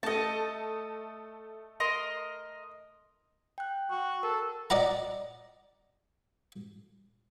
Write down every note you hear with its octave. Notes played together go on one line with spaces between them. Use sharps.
A3 A4 D#5 A5
A#4 D#5 C6
G5 F#6
F#4
A4 A#4
D5 D#5 F#5 A#5